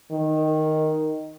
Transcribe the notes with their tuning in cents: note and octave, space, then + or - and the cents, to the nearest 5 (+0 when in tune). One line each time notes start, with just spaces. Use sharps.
D#3 +0